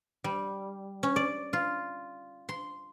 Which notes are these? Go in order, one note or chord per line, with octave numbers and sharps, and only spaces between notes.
G3
C#4
D5
F4
C6